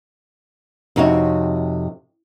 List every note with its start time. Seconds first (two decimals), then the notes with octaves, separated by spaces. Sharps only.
0.96 F2 C3 D#4 F#4 C#5